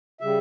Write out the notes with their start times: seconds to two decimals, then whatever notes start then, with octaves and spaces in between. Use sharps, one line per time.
0.21 C#3 G3 E5